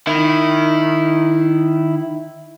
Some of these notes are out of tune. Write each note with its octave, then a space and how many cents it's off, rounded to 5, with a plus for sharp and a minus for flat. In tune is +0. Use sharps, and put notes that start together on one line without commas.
D#3 -15 E4 +0